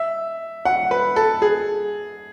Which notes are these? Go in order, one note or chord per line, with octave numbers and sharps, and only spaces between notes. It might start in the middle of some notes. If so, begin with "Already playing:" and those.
Already playing: E5
F#5
B4
A4
G#4